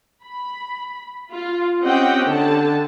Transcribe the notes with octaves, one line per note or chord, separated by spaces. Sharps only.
B5
F4
C4 C#4 G4 D#5 F#5 G5
D3 A5